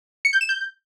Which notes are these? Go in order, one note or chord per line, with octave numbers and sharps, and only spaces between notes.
C#7
G6
E7
G6